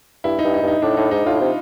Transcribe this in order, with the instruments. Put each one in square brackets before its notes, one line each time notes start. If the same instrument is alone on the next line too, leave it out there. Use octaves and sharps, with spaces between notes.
[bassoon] G2 [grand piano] E4
[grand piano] D#4
[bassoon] G2
[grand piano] D#4
[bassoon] G2
[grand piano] D#4
[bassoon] A2 [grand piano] D4
[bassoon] A2 [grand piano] D#4
[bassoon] G#2 [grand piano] D#4
[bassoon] A2 [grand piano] F4
[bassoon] C3